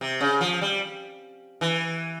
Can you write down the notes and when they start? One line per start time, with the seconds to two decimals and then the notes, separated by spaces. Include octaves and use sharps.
0.01 C3
0.21 C#3
0.41 F3
0.61 G3
1.61 E3